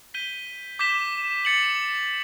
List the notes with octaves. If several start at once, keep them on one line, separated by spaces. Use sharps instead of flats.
G6 B6 D#7 G7
D6 G6 B6 E7 G7
A6 C#7 F#7